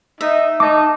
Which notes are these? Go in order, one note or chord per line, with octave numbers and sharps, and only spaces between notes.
D#4 E5
D#4 A5 D6